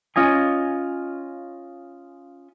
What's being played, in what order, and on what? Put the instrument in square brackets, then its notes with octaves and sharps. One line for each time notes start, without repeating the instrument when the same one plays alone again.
[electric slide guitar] C#4 F4 D#5 G#5